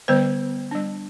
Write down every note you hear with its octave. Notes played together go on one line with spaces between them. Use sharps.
D3 G3 B3 C5
G3 D4